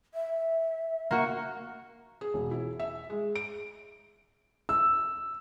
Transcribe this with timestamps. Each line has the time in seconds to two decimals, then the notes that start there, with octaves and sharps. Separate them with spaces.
0.14 E5
1.11 A#3 F#4
2.21 G#4
2.34 E1
2.51 E4
2.79 E5
3.10 G#3
3.36 D7
4.69 E6